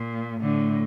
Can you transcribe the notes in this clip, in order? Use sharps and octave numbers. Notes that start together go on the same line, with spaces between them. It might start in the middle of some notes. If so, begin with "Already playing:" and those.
Already playing: A#2
A2 D3